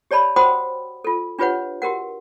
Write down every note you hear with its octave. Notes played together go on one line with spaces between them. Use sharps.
G4 C#5 D5 A5 B5
F#4 C5 F#5 G5 B5 D#6
F4 A4
D4 F4 G4 B4 C#5 F#5
F#4 G4 A#4 F#5